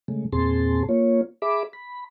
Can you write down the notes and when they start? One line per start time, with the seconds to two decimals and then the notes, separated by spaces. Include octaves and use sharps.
0.08 C#3 G#3 A3
0.33 E2 A#2 C4 G#4 A5 C6
0.89 A#3 F4 C#5
1.42 G#4 E5 B5 D6
1.73 B5